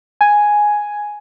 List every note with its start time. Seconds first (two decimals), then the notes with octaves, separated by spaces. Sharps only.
0.21 G#5